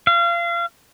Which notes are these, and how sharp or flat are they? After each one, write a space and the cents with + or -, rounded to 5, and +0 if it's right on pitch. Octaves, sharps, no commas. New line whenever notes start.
F5 -30